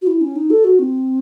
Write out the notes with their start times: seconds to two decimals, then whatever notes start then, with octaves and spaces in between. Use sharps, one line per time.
0.02 F#4
0.07 E4
0.21 C#4
0.36 D#4
0.50 A4
0.64 F#4
0.79 C4